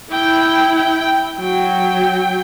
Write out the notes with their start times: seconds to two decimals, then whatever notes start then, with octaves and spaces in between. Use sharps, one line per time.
0.11 E4 G5
0.42 G5
0.75 G5
1.39 F#3 G5